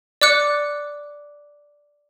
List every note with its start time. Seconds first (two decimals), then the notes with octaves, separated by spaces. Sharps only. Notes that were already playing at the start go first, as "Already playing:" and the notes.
0.22 D5 D6 F#6 C#7